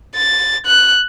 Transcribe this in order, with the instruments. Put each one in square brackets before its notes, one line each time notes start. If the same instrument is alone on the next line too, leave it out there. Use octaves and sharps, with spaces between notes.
[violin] A6
F#6